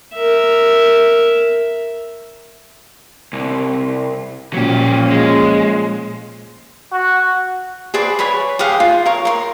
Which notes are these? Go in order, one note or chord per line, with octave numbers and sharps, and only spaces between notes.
A#4 E5
C2
A#2 F3 F#3 C#4 G4
G#3
F#4
G#4 B4 C5 D5
B4 C#5 G#5 B5
G4 G#4 F5 F#5
F4
A#4 C#5
A#4 C6